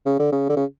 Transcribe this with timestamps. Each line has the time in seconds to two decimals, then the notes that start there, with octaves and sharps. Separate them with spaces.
0.06 C#3
0.19 D3
0.32 C#3
0.49 D3
0.56 C#3